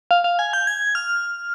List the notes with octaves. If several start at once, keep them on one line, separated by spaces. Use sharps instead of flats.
F5
F5
G#5
G6
G#6
F6